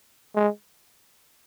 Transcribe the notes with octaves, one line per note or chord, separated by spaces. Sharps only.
G#3